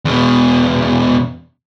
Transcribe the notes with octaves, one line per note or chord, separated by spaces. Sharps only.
E2 B2